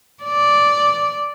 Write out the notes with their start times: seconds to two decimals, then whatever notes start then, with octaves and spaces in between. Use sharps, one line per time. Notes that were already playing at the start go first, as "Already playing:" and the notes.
0.23 D5